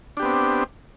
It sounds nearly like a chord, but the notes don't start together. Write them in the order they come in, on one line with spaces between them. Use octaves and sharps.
D4 G4 B3 C4